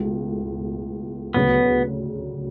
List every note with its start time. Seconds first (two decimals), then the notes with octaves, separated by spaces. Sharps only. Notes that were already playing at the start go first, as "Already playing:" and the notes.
Already playing: C#2 B2 A3 E4
1.34 D2 C#3 F#3 B3